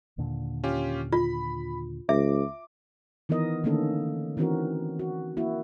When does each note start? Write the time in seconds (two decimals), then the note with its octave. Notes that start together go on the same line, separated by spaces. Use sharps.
0.18 D#2 A#2 D3
0.64 C#4 F4 G4
1.13 F4 B5
2.09 C#2 E5 D6
3.29 D#3 E3 B3 A#4 D#5
3.64 D3 D#3 A3 A#3 C#4 A4
4.37 D#3 E3 C4 C#4 F#4 A#4
4.99 F#4
5.37 A#3 E4 F#4